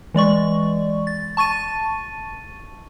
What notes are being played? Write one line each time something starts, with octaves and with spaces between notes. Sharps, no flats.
E3 G#3 D5 C#6
A6
A5 C#6 A6 D#7